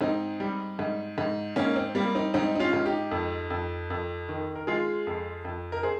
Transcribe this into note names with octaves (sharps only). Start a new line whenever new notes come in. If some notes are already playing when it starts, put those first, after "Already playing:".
G#2 C4 D#4
G3
G#2
G#2
G#2 A#3 C#4
C4
G3 A#3
C4 D#4
G#2 C4 D#4
D#4
C#4 F4
G#2
D#4 G4
F2
F2
F2
D#3
A#4
G#3 F4 G#4
F2
F2
A#4
G#4 C5